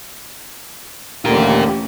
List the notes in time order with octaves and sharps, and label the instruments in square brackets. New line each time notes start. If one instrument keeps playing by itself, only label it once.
[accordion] D#2 D3 [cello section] E3 A3 C#4 [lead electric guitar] F4 A#4 [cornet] G4